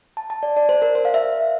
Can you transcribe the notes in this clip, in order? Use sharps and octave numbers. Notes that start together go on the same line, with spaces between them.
A5
A5
D5
D5
C5
A#4
C5
F5
E5